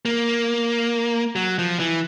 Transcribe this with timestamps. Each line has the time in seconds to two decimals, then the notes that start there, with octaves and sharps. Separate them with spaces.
0.05 A#3
1.35 F#3
1.59 F3
1.79 E3